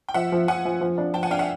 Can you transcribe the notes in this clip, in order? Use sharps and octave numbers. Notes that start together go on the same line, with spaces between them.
G5
F3 E5 F#5
F3
F3 F#5 G#5
F3
F3
D4
F3 G5 A5
F#5 G#5
D4 F5 G5
E5 F#5